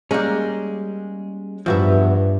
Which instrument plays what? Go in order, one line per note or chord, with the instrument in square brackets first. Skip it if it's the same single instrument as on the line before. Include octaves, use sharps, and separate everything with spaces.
[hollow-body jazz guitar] G3 C#4 [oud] G#3 A#3
[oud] E2 B3 E5 [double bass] G2 [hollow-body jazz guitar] F3 F#4